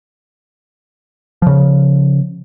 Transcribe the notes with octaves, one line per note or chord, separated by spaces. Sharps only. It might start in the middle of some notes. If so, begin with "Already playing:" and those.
C#3 F3